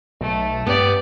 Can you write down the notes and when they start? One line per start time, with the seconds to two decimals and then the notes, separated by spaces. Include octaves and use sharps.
0.21 B1 A3
0.66 G2 B3 G4 D5